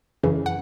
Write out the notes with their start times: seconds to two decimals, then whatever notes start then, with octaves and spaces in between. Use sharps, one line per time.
0.23 F#2 C#3 E3
0.46 F#5